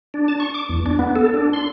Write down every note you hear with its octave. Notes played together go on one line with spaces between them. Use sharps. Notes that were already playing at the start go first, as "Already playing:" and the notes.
D4
A5
C#6
D6
E2
D4
B3
A4
D4
C6